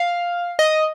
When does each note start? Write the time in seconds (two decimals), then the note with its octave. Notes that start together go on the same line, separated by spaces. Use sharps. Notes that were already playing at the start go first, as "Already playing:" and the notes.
Already playing: F5
0.59 D#5